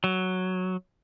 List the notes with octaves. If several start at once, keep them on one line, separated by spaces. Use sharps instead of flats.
F#3